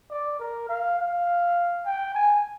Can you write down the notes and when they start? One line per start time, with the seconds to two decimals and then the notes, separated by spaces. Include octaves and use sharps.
0.11 D5
0.39 A#4
0.69 F5
0.98 F5
1.85 G5
2.14 G#5